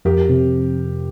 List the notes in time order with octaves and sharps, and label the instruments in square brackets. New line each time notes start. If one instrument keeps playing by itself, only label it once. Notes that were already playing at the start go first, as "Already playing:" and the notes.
[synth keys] F2 [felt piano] G4 A#4
[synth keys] C3